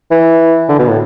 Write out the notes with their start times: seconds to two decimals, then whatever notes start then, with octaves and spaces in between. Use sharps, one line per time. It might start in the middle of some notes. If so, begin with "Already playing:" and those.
0.11 E3
0.69 D3
0.79 B2
0.89 A2